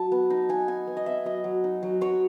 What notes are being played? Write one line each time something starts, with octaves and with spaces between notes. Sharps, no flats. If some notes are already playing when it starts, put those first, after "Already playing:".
Already playing: F#3 A5
B3
D#4
D#4 G#5
D#4 G#5
B3
D#5
B3 E5
F#3 D#5
F#3
D#4
F#3
F#3 C#5